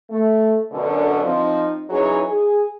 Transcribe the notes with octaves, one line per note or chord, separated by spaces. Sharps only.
A3
F#2 B2 D3
F3 C4 D#4
E3 F#3 C#4 D#4 G#4 C#5
G#4